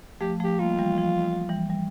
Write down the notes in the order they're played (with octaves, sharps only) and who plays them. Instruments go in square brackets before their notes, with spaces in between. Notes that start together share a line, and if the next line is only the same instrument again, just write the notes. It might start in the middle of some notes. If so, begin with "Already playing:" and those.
[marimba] F3 A3 [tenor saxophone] G4
[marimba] F3 A3
[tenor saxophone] G4
[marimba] G3 A#3 [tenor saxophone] F4
[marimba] E3 G3
F3
E3 G3
G3